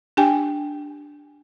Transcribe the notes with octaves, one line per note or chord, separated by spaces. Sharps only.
D4 G4 G5 G#5